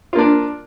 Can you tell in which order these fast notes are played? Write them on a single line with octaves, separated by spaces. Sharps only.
F4 A#3 D4